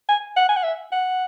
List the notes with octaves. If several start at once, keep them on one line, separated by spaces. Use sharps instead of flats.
G#5
F#5
G#5
F#5
E5
F#5